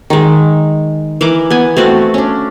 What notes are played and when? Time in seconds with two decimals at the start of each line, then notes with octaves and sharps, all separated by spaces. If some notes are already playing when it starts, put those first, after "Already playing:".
0.10 D#3 G#3
1.21 E3 A#4 D6
1.50 B3 G#5
1.77 A3 C4 F#4 F5
2.14 C#4 D4